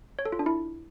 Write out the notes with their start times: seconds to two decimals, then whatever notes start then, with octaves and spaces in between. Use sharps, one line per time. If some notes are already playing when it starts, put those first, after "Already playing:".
0.19 C#5
0.25 A4
0.32 F4
0.39 D4
0.46 E4